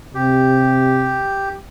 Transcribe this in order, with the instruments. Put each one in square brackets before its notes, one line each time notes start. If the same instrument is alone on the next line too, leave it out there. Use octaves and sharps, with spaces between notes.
[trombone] C3 [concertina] G4